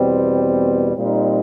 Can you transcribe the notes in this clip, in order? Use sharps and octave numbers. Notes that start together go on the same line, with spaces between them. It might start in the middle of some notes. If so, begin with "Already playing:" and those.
Already playing: E2 B2 G3 C4
A#2 G3 C4 D#4